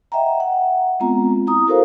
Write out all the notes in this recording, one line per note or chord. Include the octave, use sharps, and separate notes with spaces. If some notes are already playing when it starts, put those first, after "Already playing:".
D#5 E5 F#5 G5 A#5
F#5
G#3 B3 C4 F4 A#5
E4 A#5 D#6
E4 F#4 A4 A#4 C5 F5